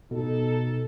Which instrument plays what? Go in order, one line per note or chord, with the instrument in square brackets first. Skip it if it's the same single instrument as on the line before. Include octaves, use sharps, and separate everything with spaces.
[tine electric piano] B2 [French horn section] D#4 A4